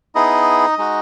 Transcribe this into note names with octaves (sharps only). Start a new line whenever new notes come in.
B3 D#4 E4 G#4 D#5
G#3 D#4 F#4